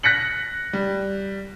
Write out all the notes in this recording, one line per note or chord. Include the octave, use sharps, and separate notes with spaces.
F#6 A#6 B6 C#7 F#7
G3